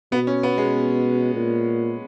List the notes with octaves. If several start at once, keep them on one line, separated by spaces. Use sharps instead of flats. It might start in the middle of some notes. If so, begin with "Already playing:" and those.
B2 B3
C#4
B3
G#3
A#2